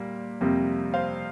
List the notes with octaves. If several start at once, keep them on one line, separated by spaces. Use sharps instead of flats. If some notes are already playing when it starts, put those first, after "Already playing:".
Already playing: A#2 G3 A#3
F2 C3 G3 A#3
C5 F5